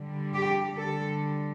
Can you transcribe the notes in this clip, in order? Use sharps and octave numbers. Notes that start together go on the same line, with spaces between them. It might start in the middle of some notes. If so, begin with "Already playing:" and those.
Already playing: D3 G3
G4
D3 G3 A4